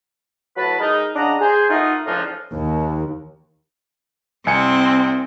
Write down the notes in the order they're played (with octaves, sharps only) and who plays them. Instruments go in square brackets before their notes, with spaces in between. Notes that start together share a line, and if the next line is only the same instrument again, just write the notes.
[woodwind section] A2 F#3 B4 A5 B5
G#3 D#4 A#4
C#3 D4 D#5 F#5 A#5
G#4 C5
A3 D#4 F4 F#4 A#4 D#5
C#2 A2 F3 D4 D#4 F4
[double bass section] D#2
[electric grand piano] C2 G#5 C#7 [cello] C4